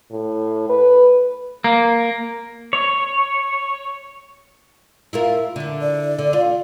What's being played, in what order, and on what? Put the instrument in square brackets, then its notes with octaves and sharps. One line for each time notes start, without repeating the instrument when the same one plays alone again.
[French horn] A2
B4
[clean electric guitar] A#3
[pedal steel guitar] C#5
[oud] E4 F4 A#4
D3 E4
[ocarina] D5
[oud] D3
F4